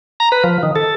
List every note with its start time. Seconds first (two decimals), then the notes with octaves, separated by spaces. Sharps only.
0.20 A#5
0.32 B4
0.44 F3
0.63 D#3
0.76 A4